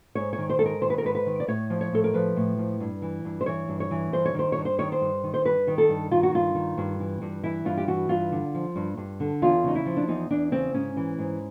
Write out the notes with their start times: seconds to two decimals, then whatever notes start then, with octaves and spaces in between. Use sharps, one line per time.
0.15 G#2 C#5
0.33 C#5
0.38 D#3
0.50 C5
0.59 G#2 A4
0.66 A#4
0.82 D#3 C5
0.90 B4
0.98 A#4
1.04 G#2 B4
1.15 B4
1.26 D#3
1.40 D5
1.48 A2 C#5
1.70 F3
1.81 C#5
1.92 A2 A4
2.04 A#4
2.14 F3 B4
2.36 A2
2.58 F3
2.80 G2
3.02 E3
3.25 G2
3.41 C5
3.46 E3 C#5
3.68 G2
3.80 C#5
3.91 E3
4.13 G2 C5
4.26 C#5
4.34 D#3 C5
4.52 G2 C#5
4.65 C5
4.78 D#3 C#5
4.92 C5
5.01 G2
5.24 D#3
5.34 C5
5.45 G2 B4
5.67 D#3
5.78 A4
5.89 G2
6.11 D#3 F4
6.23 F#4
6.33 G2 F4
6.55 D#3
6.78 G2
7.00 E3
7.22 G2
7.43 E3 E4
7.65 G2 F4
7.77 G4
7.88 E3 F#4
8.09 G2 F4
8.32 D3
8.54 F3
8.76 G2
8.97 G2
9.20 D3
9.42 E2 F4
9.64 C#3 D#4
9.75 E4
9.86 F3
9.97 D4
10.08 E2 D#4
10.30 E2 D4
10.52 C#3 C4
10.74 G#2 C#4
10.97 E3
11.18 G#2